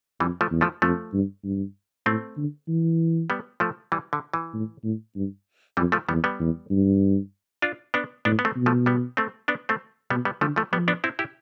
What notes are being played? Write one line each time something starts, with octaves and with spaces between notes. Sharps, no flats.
F2 E3 G3
F3 A3
E2
F3 A3
F2 F3 A3
G2
G2
A2 A3 C4
D3
E3
G3 B3
F3 A3
E3 G3
D3
E3
A2
A2
G2
F2 E3 G3
F3 A3
E2 G3 B3
G3 B3
E2
G2
D4 F4
B3 D4
A2 B3 D4
B3
A3 C4
B2
F3 A3
G3 B3
A3 C4
B3 D4
A3 C4
B2 G3 B3
G3 B3
D3 F3 A3
F3 A3
F3 G3 B3
B3 D4
C4 E4
E4 G4